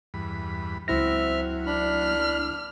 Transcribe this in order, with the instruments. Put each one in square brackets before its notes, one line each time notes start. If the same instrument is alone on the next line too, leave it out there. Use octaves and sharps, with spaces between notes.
[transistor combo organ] E2 G2 B5
[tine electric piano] C#2 E4 A#6 [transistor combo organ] F#3 [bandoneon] C4 E5 F6
[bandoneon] D4 B5 [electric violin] F6